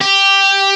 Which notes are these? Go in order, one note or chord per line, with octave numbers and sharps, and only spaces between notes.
G4